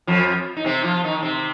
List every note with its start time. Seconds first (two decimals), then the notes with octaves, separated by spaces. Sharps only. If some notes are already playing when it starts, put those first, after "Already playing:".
0.07 F2 F3
0.57 D#4
0.65 C3 C4
0.84 F3 F4
1.04 D#3 D#4
1.23 C3 C4